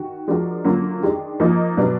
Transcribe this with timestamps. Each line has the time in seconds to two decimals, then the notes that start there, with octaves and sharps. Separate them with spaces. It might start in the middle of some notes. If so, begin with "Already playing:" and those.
Already playing: D#3 F#4
0.28 F3 G#3 D4 F#4 A#4
0.64 F#2 D3 F#3 A#3 F4
1.03 D#3 G#3 D4
1.40 F3 A#3 D#4 A#4
1.77 B2 F#3 B3 D4